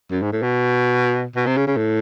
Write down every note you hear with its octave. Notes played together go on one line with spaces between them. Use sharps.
F#2
G#2
A2
B2
B2
C3
C#3
C#3
A2